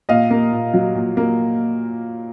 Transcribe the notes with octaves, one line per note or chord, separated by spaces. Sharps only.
A#2 D#5 F5
A#3
A#2
F#3
A#2
A#3